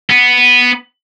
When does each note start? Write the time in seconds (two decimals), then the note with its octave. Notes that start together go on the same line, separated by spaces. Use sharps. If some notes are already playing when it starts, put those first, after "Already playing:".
0.10 B3